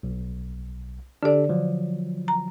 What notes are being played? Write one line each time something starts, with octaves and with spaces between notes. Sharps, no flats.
B1
D3 D4 G4 A4 D5
F3 F#3
A#5